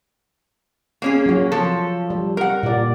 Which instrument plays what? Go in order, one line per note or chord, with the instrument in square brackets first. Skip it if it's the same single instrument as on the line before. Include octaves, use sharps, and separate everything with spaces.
[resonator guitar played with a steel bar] A#3 C#4 G#4
[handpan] F#3 F#4
[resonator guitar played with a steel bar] F3 A4
[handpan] G3
[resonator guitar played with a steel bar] A#4 F#5
[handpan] A#2 D5